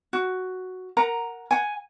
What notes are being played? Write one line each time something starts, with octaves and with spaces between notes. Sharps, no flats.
F#4
A#4 F#5 A#5
F#5 G#5